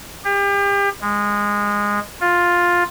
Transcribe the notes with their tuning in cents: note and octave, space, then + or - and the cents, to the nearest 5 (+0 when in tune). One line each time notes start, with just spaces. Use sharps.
G4 +35
G#3 -15
F4 +10